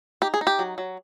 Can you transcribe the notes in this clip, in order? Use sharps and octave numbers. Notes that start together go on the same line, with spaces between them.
D#4 G4
G#4
D#4
G4
F#3
F#3